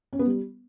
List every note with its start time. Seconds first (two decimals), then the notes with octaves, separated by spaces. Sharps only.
0.13 C#4
0.19 B3
0.26 G3